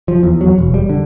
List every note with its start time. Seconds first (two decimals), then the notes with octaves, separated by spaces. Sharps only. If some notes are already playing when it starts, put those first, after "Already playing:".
0.08 F3
0.23 E2
0.41 F#3
0.58 E1
0.74 G3
0.89 D3